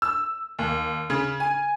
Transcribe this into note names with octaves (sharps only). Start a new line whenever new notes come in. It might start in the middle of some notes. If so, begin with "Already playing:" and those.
E6
D#2
C#3
G#5